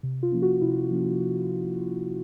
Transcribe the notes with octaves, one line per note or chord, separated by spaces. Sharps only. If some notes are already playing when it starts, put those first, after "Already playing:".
C3
F4
F3 A#3 C#4
F#4
C3 E4
F3 A#3 C#4